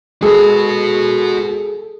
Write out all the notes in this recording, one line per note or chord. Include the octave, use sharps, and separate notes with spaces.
G#3 F#4 G#4 A4 B4